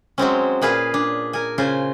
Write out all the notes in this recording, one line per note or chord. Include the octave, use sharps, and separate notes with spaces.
F#3 G#3 C4 C#4
A#2 G#4 B4 F5
D4
A#4 G#5
C#3 F4 C5 G#5